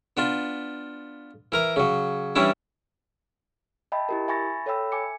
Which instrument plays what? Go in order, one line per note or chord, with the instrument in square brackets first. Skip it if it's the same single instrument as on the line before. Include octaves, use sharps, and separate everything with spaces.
[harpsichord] B3 D4 F4
E3 A#4 A#5
C#3 F#3
E3 G3 C#4 D4 E4
[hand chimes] D#5 E5 G5 A5 B5
E4 G4 A#4
E5 G#5 B5 C#6 A6 A#6
A4 C#5 E5 G5 B5 E6
G#5 D6 C#7